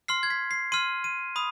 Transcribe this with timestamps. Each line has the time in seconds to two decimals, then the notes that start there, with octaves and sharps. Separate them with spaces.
0.08 C6 F6 C7
0.23 G#6
0.30 B6
0.51 C7
0.72 C6 F6 D#7
1.04 D#7
1.36 B5 D#6